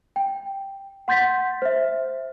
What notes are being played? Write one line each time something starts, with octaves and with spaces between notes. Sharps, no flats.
G5
F#5 C6 G6 A6 B6
C5 E5